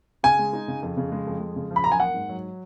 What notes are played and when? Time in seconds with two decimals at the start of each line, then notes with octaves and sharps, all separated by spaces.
0.23 C#3 G#5
0.39 G#3
0.53 D#4
0.68 C#3
0.82 F2
0.97 C#3
1.12 G#3
1.27 F2
1.40 G#3
1.56 C#3
1.71 F3
1.76 B5
1.84 F#2 A#5
1.92 G#5
1.99 A#3 F#5
2.14 G#2
2.29 F#3